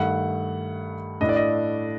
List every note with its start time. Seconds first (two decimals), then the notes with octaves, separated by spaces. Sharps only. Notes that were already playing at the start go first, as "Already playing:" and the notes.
Already playing: G2 D#3 A3 F#5
1.21 A2 A3 D4 D#5
1.29 D5
1.36 D#5